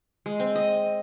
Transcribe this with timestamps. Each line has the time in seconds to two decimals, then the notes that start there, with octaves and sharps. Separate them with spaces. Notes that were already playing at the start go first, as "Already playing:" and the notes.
0.26 G#3
0.40 C4
0.55 D#5